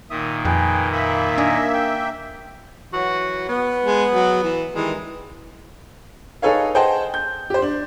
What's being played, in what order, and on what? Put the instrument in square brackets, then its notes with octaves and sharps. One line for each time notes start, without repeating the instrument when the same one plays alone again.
[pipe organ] A#2 D#3 [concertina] E5 D#6
[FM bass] F2 [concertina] G#4 B4 G5
[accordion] A#3 E5 [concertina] B5
[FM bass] D4 [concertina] D#5 G#5
[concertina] G5
[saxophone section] E3 F#3 F#4
B3
[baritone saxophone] G#3
F#3
E3
[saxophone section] D#3 G3 G#3 [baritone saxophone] E3
[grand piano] D#4 G#4 A4 B4 C#5 F5
G#4 C5 D#5 F#5 G5 A5
G6
G4 C5
D4